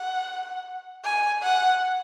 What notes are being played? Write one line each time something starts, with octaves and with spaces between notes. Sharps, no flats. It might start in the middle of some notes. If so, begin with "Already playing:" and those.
Already playing: F#5
G#5
F#5